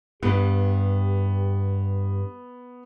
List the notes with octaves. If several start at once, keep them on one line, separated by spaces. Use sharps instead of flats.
G2 B3 G4